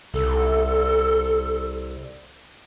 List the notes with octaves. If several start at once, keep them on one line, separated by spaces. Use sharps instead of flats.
C2 A4